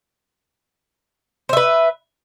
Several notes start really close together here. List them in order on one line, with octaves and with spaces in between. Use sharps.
C5 E5 B4